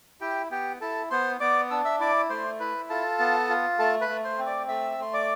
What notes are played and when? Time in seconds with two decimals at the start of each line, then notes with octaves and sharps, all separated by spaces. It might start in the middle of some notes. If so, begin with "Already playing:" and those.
0.21 E4 G4 G5
0.51 B3 G4 G5
0.81 E4 A4 A5
1.11 B3 C5 C6
1.40 B3 D5 D6
1.71 D4 E6
1.85 E5 E6
2.00 E4 D5 D6
2.30 A3 C5 C6
2.60 E4 B4 B5
2.90 F4 A4 A5
3.20 B3
3.49 F4
3.79 A3 A4 A5
4.01 B4 B5
4.09 A3
4.24 C5 C6
4.38 C4
4.46 D5 D6
4.68 A3 E5 E6
4.98 A3 C6
5.13 D5 D6